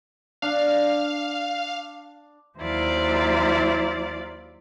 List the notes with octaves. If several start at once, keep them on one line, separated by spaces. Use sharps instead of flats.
D4 F5
D#2 F#3 E4 C5 D5 F5